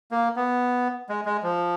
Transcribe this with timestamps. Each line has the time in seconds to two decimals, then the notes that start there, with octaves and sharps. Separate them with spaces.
0.11 A#3
0.36 B3
1.09 G#3
1.26 G#3
1.43 F3